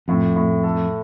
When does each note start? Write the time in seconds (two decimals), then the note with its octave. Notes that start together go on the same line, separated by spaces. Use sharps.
0.08 F2 A2
0.36 A2
0.64 A4